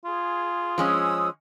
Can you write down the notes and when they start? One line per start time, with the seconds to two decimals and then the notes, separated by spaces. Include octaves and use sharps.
0.05 F4 G#4
0.78 F3 G#3 C#4 G#4 D#6 E6